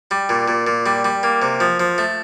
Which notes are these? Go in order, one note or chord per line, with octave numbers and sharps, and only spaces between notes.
G3
A#2
A#2
A#2
G3
G3
A#3
C3
F3
F3
A3